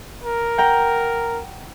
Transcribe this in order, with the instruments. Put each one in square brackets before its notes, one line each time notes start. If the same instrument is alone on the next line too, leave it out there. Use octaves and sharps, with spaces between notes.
[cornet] A#4
[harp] F#5 G5 A#5